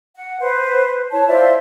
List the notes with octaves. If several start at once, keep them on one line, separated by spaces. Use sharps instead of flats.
F#5
B4 C5
E4 C#5 A5
F4 C5 D5 E5